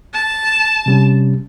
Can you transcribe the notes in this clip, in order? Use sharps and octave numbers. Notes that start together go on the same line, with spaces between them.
A5
C3 G3 C#4